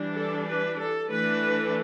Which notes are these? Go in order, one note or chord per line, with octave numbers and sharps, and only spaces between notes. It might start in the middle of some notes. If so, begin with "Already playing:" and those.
Already playing: E3 G3 D4
A4
B4
A4
E3 A3 D4 B4